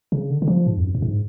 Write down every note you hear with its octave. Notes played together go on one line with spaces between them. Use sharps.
C#3
D3
D3
F3
G#2
F2
F#2
F#2
G#2